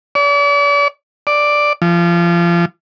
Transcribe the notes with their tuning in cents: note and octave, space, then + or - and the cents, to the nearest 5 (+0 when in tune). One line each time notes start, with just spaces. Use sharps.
D5 -40
D5 +5
F3 -30